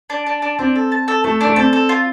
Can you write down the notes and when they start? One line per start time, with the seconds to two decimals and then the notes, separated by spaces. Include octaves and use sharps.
0.10 D4
0.26 D4
0.42 D4
0.59 C4 D4
0.76 A4
0.92 A5
1.08 A4
1.24 A3 A4
1.41 D4
1.47 A3
1.56 C4 A4
1.73 A4
1.89 F4